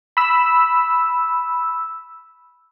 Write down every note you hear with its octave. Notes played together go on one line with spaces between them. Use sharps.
B5 E6